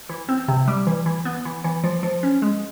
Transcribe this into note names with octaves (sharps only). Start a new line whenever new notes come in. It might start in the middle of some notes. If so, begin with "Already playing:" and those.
E3
C4
C3
G3
E3
E3
B3
E3
E3
F3
F3
C#4
G#3